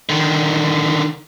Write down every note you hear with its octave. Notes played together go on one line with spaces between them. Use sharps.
D3 D#3